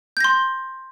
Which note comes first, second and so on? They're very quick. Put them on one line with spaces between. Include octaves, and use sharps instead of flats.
G6 A#6 C6